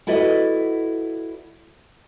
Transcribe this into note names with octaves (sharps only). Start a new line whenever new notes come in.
E4 F#4 A4 B4 D5 D#5